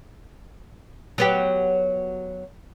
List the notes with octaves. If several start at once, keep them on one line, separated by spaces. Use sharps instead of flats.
F#3 B3 G4